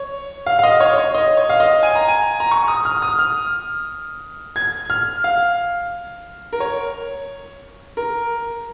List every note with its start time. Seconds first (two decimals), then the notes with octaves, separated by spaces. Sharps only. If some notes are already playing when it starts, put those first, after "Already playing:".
Already playing: C#5
0.46 F5
0.59 F5
0.63 D#5
0.80 C#5
0.98 C#5
1.14 D#5
1.37 C#5
1.49 F5
1.60 D#5
1.83 G#5
1.95 A#5
2.08 G#5
2.40 A#5
2.51 C#6
2.68 D#6
2.85 F6
3.02 D#6
3.19 F6
4.56 G#6
4.90 F6
5.24 F5
6.53 A#4
6.60 C#5
7.97 A#4